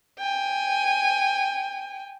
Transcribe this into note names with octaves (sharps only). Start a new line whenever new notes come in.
G5 G#5